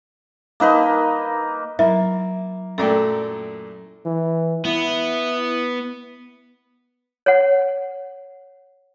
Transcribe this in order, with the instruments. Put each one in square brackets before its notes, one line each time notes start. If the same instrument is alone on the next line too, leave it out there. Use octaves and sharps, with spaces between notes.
[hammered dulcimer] A#3 D#4 B4 D#5
[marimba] F#3 [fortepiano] A#3 [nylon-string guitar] E4 [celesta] E5
[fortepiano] F#2 A#2 A3 [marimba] A4 D5 G5
[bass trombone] E3
[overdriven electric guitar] B3 [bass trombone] E4
[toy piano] C#5 F#5